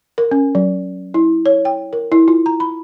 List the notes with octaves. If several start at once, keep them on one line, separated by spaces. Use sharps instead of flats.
A#4
C#4
F#3
E4
C#5
G5
A#4
E4
F4
A#5
B5